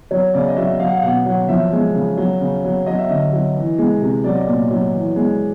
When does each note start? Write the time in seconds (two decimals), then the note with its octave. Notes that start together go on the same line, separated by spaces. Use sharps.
0.11 F#3 C#5
0.34 C#3 D5
0.48 D#5
0.57 F#3 E5
0.79 F#3 F5
0.87 F#5
0.94 F5
1.03 B2 F#5
1.26 F#3 F#5
1.48 F3 E5
1.72 G#3
1.95 C#3
2.17 F#3
2.41 C#3
2.64 F#3
2.86 F#3 D#5
2.98 E5
3.10 D3 D#5
3.33 F#3
3.56 E3
3.78 G#3
4.01 C3
4.24 F#3 D5
4.34 D#5
4.44 A#2 D5
4.70 F#3
4.94 E3
5.16 G#3